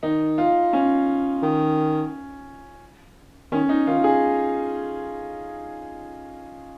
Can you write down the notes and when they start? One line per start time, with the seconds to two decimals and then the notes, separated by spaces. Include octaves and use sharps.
0.03 D#3 D#4
0.38 F4
0.73 C#4
1.42 D#3
3.52 D#3 C#4
3.69 D#4
3.87 D#3 F4
4.04 G#4